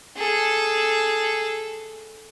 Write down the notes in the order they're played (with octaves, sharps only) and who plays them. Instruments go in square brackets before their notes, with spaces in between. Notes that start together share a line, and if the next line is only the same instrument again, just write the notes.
[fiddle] G#4 A4